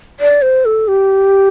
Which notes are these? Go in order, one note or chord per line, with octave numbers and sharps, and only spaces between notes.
D5
C5
A4
G4